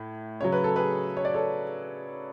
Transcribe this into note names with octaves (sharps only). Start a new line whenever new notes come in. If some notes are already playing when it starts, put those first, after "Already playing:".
Already playing: A2
C#3 F#3 C#5
B4
A4
G#4 B4
C#5
D5
A4 C#5